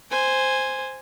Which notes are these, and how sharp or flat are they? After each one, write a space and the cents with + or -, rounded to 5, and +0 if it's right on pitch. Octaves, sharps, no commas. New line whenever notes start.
C5 +0 G#5 -5